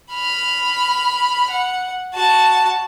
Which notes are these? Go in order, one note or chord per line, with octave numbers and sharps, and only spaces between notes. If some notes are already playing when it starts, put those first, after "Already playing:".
B5 F6
F#5
F#4 A5